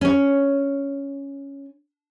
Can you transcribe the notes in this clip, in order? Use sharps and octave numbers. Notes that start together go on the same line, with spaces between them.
C#4 C#5